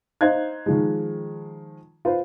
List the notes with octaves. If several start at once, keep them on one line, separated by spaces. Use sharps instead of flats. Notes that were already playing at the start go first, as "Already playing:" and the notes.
D#4 C5 D#5 F5 F#6 G#6
D#3 F3 G#3
F4 B4 C5